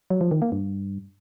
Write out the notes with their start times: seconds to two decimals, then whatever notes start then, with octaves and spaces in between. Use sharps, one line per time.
0.10 F#3
0.21 F3
0.31 D#3
0.42 A#3
0.52 G2